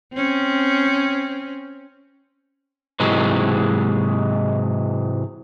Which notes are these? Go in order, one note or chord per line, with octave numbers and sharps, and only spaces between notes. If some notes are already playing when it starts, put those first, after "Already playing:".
C4 C#4
G#2 C3 E3 F#3 G#3